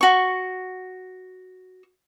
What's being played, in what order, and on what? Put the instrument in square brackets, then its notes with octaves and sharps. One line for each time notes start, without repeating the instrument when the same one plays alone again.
[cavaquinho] F#4 C#6